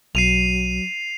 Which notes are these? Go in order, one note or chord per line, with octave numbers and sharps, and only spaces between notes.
B1 F#3 C7 D#7 F7